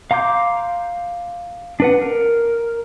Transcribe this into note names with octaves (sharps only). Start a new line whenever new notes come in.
F5 A#5 C6 D6 G6
D4 B4 F#5
A#4